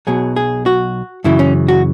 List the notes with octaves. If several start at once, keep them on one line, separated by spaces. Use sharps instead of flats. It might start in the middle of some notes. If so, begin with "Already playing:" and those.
B1 B2 F#3 G#4
G#4
F#4
F#2 C#3 E3 E4
C#4
F#4